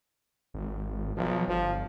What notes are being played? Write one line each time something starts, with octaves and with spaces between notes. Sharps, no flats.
G#1
B1 F3
G1 F3